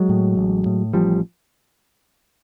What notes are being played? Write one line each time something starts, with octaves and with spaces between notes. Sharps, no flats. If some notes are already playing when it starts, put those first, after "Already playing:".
Already playing: F#3 G#3
A2
A1
A2
A1 F3 G3